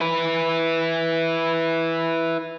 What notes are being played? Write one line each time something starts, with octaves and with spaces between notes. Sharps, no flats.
E4 B4